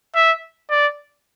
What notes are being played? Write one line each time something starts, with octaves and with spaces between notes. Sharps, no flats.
E5
D5